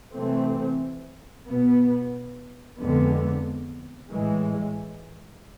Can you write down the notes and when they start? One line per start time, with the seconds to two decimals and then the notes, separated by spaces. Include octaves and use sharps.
0.14 C3 E3 A3 C4
1.47 B2 B3
2.78 F2 D3 G#3 B3
4.11 A2 E3 G#3